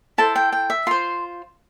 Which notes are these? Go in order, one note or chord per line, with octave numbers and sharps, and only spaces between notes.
E4 A4 C5 A5
G5
G5
E5
F4 C5 C6